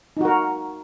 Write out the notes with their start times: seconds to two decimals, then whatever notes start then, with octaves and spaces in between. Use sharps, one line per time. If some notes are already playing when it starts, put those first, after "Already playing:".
0.17 D#4
0.21 F#4
0.25 A#4